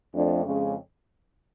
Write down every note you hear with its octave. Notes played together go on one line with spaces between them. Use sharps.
F2 F3 A3 D4
F2 C#3 G#3 C#4